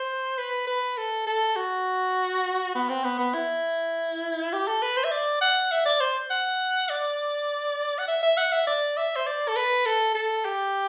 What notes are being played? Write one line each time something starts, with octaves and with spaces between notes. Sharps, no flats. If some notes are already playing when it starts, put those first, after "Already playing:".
Already playing: C5
B4
B4
A4
A4
F#4
B3
C4
B3
B3
E4
G4
A4
B4
C5
E5
D5
F#5
E5
D5
C5
F#5
D5
F#5
E5
E5
F#5
E5
D5
E5
C5
D5
A4
B4
A4
A4
G4